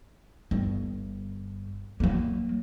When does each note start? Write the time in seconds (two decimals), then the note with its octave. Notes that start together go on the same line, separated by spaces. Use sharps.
0.51 G1
2.00 F#3 A#3